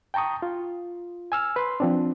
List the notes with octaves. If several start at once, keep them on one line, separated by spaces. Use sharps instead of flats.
G5 A5 A#5 C#6 D#6
F4
G#5 E6 F6
B4 C6
F3 C4 D4